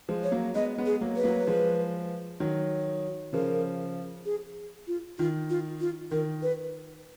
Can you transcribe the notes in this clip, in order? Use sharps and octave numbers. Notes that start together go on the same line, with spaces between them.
F3 G#3
C#5
F#3 A#3
G#3 B3 D#5
G#3 B3
G#4
F#3 A#3
B4
F#3 A#3
F3 G#3
D#3 F#3
C#3 F3 A#4
G#4
F4
D#3 F4
F4
F4
D#3 A#4
B4